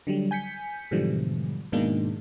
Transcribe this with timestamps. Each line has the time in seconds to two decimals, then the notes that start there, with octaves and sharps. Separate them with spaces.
0.07 D3 F#3 G3
0.31 G#5 G6 B6 C#7
0.91 G#2 B2 D3 E3 F3 G3
1.72 G#2 B2 D#3 G#3 A#3 D4